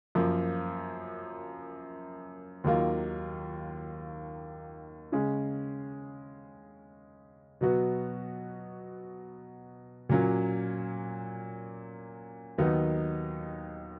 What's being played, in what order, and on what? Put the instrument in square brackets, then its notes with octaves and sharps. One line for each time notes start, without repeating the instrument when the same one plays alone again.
[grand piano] F#2 F3 A#3
D#2 D#3 F#3 A#3 F4
C#3 G#3 C#4 G#4
B2 F#3 B3 F#4
A#2 F#3 A#3 C#4
D#2 D#3 F#3 B3 D#4